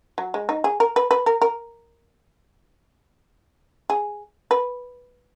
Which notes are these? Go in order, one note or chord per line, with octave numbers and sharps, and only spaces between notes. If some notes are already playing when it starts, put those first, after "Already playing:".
F#3
G#3
D#4
G#4
A#4
B4
B4
A#4
A#4
G#4
B4